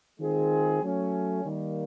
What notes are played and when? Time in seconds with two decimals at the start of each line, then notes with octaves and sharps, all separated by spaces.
0.20 D#3 G#3 C4 F4 G#4
0.82 F#3 A3 C#4
1.44 D#3 G3 A#3